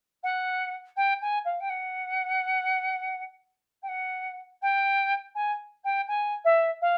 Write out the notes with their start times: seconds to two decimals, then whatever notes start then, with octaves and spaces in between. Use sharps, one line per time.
0.23 F#5
0.96 G5
1.21 G#5
1.45 F5
1.60 G5
1.69 F#5
3.82 G5
3.88 F#5
4.61 G5
5.35 G#5
5.84 G5
6.08 G#5
6.44 E5
6.81 F5